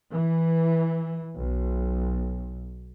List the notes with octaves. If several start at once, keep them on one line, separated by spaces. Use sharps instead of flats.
E3
B1